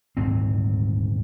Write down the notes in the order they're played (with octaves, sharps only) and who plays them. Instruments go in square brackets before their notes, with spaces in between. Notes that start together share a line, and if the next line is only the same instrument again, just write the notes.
[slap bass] D#1 D2 G#2 C4